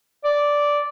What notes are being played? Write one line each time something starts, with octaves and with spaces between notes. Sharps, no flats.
D5